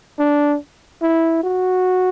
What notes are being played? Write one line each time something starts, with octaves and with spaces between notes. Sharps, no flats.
D4
E4
F#4